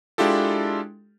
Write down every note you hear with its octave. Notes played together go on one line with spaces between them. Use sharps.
G#3 D4 E4 F4 G4 A4